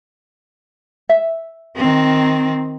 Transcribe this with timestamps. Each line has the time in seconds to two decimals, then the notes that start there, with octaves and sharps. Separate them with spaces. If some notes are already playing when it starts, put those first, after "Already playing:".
1.09 E5
1.76 D#3 C4